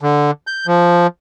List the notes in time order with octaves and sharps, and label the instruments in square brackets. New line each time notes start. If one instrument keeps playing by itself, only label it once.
[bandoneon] D3
G6
F3